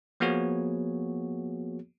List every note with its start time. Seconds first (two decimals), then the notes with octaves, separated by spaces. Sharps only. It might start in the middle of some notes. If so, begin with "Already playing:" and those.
0.20 F3 A#3 B3 F#4 G#4 C#5